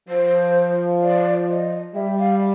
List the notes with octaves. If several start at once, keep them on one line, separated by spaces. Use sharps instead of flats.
F3 C5
D5
D#5
G3 E5
F5